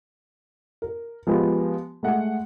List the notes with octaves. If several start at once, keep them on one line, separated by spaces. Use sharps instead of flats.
A#4
F3 G#3 B3 G4
G#3 A3 F#5